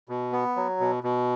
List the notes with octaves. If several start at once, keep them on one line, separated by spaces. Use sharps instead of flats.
B2
B3
F#3
B2
B2